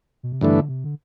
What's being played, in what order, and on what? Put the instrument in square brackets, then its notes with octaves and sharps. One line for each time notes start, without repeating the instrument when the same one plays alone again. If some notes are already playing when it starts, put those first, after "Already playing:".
[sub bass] B2
C3
[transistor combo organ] G2 E3 A3 D4 [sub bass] D3
[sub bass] C3
D3